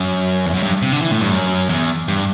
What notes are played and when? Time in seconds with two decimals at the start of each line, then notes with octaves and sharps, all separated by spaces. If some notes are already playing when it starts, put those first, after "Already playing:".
Already playing: F#2
0.46 E2
0.54 F#2
0.63 G2
0.82 C3
0.92 D3
1.02 E3
1.11 A2
1.21 G2
1.31 F#2
1.69 E2
2.08 G2